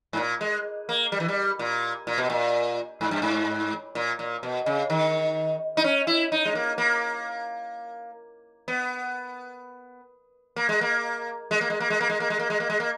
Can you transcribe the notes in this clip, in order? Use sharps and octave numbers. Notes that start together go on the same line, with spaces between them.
G#2
A#2
G#3
A#3
G3
E3
G3
A#2
A#2
B2
A#2
G#2
G2
G#2
A#2
A#2
B2
C#3
D#3
D#4
C#4
E4
D#4
G#3
A#3
A#3
B3
A#3
G#3
A#3
G#3
A#3
G#3
A#3
G#3
A#3
G#3
A#3
G#3
A#3
G#3
A#3
G#3
A#3